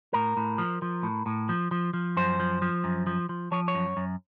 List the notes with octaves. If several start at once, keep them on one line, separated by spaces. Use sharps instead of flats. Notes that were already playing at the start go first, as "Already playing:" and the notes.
A2 A#4
A2
F3
F3
A2
A2
F3
F3
F3
F#2 C5
F3
F3
F#2
F3
F3
F3 C#5
C#5
F#2
F#2